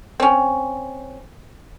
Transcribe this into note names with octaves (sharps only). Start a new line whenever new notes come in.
C4 C#4